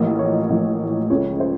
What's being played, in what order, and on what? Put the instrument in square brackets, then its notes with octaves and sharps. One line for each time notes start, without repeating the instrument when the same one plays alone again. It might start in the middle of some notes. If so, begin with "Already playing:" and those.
Already playing: [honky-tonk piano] A1 A2 F3 A#3 D#5
C#5
A1 A2 F3 A#3
C#2 C#3 A3 C#5
C5